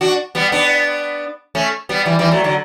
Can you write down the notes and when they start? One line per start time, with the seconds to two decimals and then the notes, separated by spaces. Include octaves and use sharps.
0.01 D4 F#4
0.35 G3 B3
0.52 B3 D4
1.55 A3 C#4
1.89 G3 B3
2.06 E3 G3
2.19 E3 G3
2.31 F#3 A3
2.44 D3 F#3